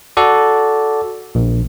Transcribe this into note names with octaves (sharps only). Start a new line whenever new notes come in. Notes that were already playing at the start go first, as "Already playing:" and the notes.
F#4 A4 D5
A#1